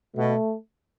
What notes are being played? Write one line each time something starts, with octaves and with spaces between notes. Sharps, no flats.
B2 A3